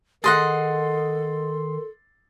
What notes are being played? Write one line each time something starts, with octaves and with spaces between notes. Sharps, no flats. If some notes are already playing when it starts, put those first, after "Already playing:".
D#3 G#4 A4 D#5 F#5 C6 A6